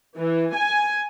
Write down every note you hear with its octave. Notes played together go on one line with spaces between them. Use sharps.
E3
G#5